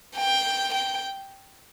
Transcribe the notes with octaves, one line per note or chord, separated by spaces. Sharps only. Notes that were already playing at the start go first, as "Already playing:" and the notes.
G5
G5